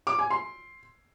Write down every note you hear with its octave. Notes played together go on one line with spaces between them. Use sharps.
D6
G#5
C6